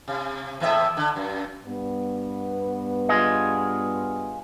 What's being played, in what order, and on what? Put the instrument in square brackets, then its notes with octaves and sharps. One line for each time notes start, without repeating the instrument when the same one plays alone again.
[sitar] C3
E2 A2 E5
D3
F#2
[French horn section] G2 B3
[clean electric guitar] F4 G#4 D#5